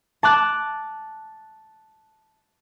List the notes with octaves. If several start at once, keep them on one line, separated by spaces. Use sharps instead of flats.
A5 D6 F#6